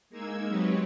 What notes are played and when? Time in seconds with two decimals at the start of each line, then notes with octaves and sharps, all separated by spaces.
0.10 G#3 A#3 D#4 E6 G#6
0.49 F#3 G#3 C4 G4 B4 C#5